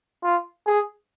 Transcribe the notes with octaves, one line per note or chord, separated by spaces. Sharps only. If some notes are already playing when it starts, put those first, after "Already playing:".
F4
G#4